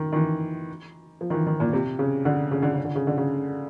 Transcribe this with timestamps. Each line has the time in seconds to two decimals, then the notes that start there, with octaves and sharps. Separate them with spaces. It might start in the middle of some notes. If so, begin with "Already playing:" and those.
Already playing: D#3
0.13 D#3
0.16 E3
1.21 F3
1.30 D#3
1.34 E3
1.47 D#3
1.60 A#2
1.73 C3
1.99 C#3
2.25 D3
2.51 C#3
2.63 D3
2.74 C#3
2.85 D3
2.95 C#3
3.07 D3
3.18 C#3